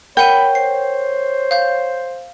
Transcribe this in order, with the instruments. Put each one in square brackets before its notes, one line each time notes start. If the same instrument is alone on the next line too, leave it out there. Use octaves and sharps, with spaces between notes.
[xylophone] A#4 F#5 D#7 [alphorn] C#5 [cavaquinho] G5 [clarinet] B5
[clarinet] C5 [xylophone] C7
[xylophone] F5 G6